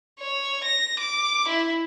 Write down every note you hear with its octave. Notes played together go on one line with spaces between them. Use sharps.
C#5
A#6
D6
E4